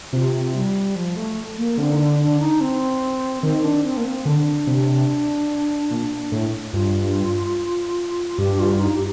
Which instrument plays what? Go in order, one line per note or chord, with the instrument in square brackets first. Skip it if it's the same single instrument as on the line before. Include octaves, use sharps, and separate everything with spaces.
[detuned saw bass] C3 [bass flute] F4
[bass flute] G3
F3
A3
A#3
[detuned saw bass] D3 [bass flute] C4
[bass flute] D#4
D4
D4
D#4
C4
[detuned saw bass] D#3 [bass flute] C4
[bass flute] D4
C4
A#3
C4
[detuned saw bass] D3 [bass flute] D4
[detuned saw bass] C3
A#2
A2
[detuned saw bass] G2 [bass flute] F4
[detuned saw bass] G2 [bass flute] G4
[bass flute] F4
D#4
G4